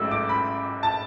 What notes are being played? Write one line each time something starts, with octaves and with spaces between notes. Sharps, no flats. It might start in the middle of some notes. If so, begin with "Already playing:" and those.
Already playing: A1 G#2 F#3 A3 E6
D6
B5
A5